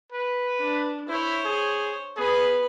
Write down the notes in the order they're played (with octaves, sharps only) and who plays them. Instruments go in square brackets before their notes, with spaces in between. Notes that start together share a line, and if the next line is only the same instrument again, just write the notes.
[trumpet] B4
[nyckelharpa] D4
[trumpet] E4 [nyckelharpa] C5 C#5
[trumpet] G#4
[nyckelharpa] B3 B5 [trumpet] G#4